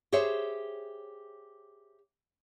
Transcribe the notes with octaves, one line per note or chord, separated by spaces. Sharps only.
G4 G#4 C5 C#5 E5